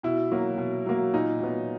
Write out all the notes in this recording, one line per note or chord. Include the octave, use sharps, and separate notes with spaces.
B2 E4
F#3 A#3
B2
F#3 A#3
A#2 D#4
F#3 B3